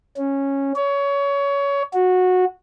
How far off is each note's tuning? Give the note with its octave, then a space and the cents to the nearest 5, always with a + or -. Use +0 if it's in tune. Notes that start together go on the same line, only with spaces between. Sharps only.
C#4 -10
C#5 +20
F#4 -15